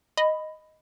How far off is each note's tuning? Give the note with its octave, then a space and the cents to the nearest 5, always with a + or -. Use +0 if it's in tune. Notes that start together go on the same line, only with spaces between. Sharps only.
D#5 +0 B5 +10